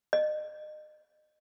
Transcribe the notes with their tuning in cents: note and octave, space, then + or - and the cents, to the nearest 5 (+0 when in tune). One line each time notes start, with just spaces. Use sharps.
D#5 -35